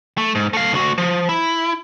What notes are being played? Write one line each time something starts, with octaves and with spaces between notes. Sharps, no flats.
A3
G#2
A3 F5
D2 F#4
F3
E4